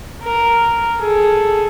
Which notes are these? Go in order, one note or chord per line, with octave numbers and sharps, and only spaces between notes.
A#4
G#4 A4